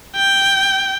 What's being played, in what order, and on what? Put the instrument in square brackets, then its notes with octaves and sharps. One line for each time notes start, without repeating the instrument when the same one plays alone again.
[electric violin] G5